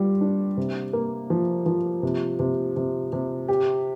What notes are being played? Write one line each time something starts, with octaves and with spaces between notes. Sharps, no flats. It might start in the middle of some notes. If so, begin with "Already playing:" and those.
Already playing: G3 F4
D4
C3
A#3
F3
F3
C3
C3
C3
C3
G4